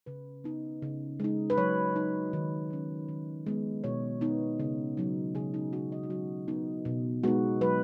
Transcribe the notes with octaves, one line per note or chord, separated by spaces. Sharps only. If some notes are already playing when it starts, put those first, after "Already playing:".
C#3 B4
B3 D#4
C#3
G#3 D#4
B4
F#3 C#5
D#4
D#3
F#3 C#4
D#3
G#3 B3
B2 C#5
B3 D#4
C#3
F#3 D#4
C#3 G#4
D#4
G#3 C#4 F#4
D#5
D#4
F#3 F#4
B3 D#4
B2
G#3 B3 D#4 F#4
F#3 B4